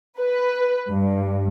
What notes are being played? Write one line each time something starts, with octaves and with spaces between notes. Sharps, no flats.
B4
G2